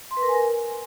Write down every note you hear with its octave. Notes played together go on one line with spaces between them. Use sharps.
C6
B4
A#4
G#5
A#4